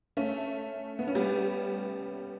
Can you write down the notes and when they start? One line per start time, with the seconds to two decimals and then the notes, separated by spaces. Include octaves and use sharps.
0.17 A3 C#4
0.99 B3
1.07 C#4
1.15 G3 B3